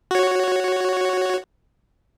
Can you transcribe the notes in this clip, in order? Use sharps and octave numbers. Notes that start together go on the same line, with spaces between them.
F#4 C#5